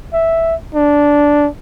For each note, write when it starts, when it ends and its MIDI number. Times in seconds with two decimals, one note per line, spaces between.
0.13 0.55 76
0.75 1.48 62